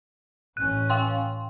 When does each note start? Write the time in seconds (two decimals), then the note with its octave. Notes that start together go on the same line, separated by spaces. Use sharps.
0.57 A1 C#4 F#6
0.90 F5 G5 C6